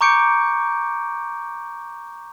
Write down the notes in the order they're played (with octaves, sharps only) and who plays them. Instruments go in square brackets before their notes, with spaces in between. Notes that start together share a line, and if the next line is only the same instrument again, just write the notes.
[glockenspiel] A#5 C#6 D6 G6 C#7 D7